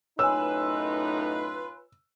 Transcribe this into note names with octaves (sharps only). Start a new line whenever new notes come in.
F#2 A2 D#4 F4 B4 C#5 G#5 E6